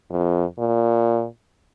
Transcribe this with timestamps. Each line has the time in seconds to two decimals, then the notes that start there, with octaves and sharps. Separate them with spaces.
0.10 F2
0.58 A#2